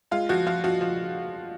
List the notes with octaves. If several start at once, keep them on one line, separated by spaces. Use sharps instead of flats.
G#3 F4
F3 F#4
F3 F4
F3 F#4
F3